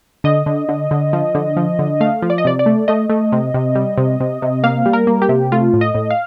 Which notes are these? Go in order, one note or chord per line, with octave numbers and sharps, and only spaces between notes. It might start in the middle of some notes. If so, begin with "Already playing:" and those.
D3 D#5
D3
D3
D3
F3
D3
F3
D3
A3 F5
F3
D5
D#5
C3 D5
D5
A3
A3 D#5
A3
C3
C3
G3
C3
C3
C3
A#3 F5
G3
A#4
A#3
G4
C3
A3 F4
A2
D#5
A2
F5